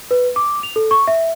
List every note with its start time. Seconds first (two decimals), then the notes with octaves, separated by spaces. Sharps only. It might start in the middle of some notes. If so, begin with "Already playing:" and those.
0.11 B4
0.36 D6
0.63 F7
0.76 A4
0.91 C#6
1.07 E5